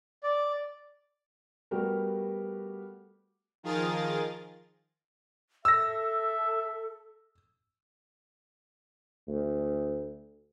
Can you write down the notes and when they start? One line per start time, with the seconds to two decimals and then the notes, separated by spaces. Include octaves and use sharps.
0.23 D5
1.71 G3 A3 B3 F#4 G4 A#4
3.63 D#3 F3 F4 G#4 A#4 A6
5.65 A4 E5 E6 A#6
9.27 D2